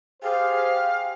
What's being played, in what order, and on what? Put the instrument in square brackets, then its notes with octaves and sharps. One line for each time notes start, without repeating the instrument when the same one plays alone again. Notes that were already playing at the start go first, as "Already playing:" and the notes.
[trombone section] G4 G#4 C5 [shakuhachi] F5